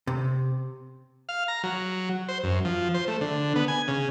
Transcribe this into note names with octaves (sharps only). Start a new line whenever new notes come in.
C3
F5
A#5
F#3
C5
F#2
F3
C5
A3
D3
B3
G#5
C#3